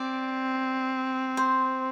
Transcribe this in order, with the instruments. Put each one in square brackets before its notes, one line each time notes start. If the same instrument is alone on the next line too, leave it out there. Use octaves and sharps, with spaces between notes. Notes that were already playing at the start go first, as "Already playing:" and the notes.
Already playing: [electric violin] C4 [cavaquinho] D5
[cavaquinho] C5